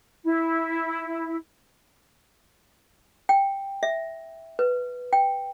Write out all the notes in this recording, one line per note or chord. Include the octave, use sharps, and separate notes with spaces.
E4
G5
E5
B4
G5